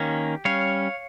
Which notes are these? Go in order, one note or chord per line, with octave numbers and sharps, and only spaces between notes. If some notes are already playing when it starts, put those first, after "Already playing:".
Already playing: D#3 A#3 C#4 G4
G3 C#4 C#5 F5